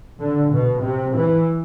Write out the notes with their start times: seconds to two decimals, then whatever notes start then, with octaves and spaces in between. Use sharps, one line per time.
0.19 D3
0.52 B2
0.83 C3
1.15 E3